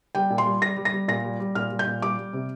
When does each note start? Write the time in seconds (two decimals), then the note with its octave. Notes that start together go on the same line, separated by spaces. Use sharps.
0.15 G3 G5
0.30 A#2
0.38 C6
0.46 G3
0.61 G3 A#6
0.77 G3
0.85 A#6
0.92 G3
1.08 A#2 A#6
1.25 G3
1.40 G3
1.55 A#2 F6
1.71 G3
1.79 G6
1.87 A#2
2.02 G3 D6
2.18 G3
2.33 C3